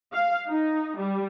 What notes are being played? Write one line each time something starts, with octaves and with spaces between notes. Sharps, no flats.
F5
D#4
G3